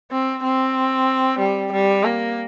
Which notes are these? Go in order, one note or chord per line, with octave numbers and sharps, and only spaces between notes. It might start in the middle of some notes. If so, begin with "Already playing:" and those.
C4
C4
G3
G3
A#3